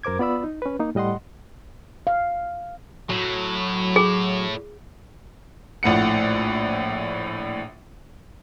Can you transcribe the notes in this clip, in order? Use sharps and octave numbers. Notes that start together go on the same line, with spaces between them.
F#2 A#4 C5 D6 G#6
B3 F4 D5 B5 E6
D#4
C#4 B4
A#3 D#4
A2 G3 D#5 F#5 C6
F5
A2 F#3
G#4
A#1 A2 F#5 C#7